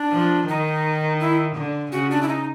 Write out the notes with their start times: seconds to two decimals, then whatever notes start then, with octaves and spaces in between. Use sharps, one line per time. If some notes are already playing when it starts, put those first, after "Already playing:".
Already playing: D4
0.12 F3
0.48 D#3 D#4
1.20 E4
1.56 D3
1.92 C#3 F#4
2.11 D4
2.23 E4
2.28 D#4